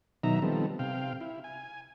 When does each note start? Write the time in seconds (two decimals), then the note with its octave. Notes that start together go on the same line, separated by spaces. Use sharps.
0.24 B2 D#3 F#3 D#4 E5 A#5
0.42 D#3 F3 G3 B3 C4 A4
0.79 C3 F5 G5
1.21 E4
1.44 G#5